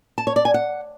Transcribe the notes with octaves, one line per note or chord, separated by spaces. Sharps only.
A5
C#5
D5
G#5
F#5